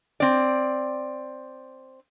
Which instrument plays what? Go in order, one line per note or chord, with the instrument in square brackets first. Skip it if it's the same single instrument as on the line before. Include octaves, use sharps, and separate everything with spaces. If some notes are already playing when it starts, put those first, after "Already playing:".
[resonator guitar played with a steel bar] C4 D5